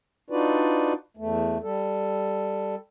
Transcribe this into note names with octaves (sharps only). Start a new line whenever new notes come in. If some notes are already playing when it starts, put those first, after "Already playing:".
D4 D#4 F4 F#4 B4 D5
E2 A3
G3 A4